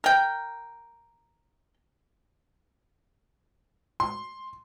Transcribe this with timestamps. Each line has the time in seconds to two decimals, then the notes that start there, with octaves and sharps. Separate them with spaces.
0.04 A#4 G5
4.00 C6